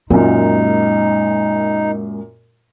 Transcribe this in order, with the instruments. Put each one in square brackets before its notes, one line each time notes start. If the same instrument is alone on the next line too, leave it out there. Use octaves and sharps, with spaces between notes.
[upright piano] F#2 A#2 [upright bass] G#3 [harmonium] D#4